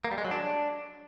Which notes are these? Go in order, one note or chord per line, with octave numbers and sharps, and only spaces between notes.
A#3
G3
G#3
F#3
D4